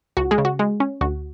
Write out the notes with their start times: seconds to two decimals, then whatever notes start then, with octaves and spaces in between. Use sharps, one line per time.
0.17 C#2 F#4
0.31 G#3 G#4
0.38 C#3
0.45 F#4
0.59 G#3
0.80 C#4
1.01 D2 F#4